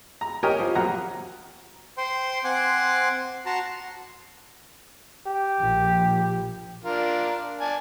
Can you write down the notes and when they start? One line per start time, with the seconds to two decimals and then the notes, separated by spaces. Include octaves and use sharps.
0.21 A#5
0.43 G4 A#4 C#5 D#5 G#5
0.59 F3
0.75 A#1 F#3 F#5 A#5
1.97 C5 G5 C6
2.44 C4 F#5 G#5 C6 D6
3.46 F#4 A5 A#5 C6
5.27 G4
5.61 A#1 F3
6.84 D4 F4 A#4
7.60 D5 G#5 A5